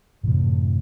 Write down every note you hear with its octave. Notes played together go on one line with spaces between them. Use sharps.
F#2 A2 C3 E3